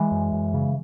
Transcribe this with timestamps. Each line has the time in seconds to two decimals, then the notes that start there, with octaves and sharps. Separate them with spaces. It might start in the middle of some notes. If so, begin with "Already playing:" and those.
Already playing: E3 G#3
0.12 F#2
0.33 F#2
0.54 C#3